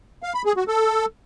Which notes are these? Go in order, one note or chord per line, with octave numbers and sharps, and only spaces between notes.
F5
B5
G#4
F#4
A4